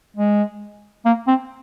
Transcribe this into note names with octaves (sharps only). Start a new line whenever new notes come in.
G#3
A#3
C4